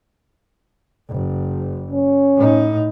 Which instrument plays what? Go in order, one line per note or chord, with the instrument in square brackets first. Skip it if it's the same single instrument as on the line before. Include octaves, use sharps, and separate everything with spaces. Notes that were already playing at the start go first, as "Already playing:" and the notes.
[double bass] F#1
[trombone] C#4
[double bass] A2 D#4